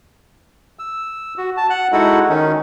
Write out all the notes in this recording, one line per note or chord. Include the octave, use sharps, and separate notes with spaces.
E6
F#4
A5
F#5 F#6
G#3 D#4 E4 F#4 A4 F#5
D#3 C#4 D#4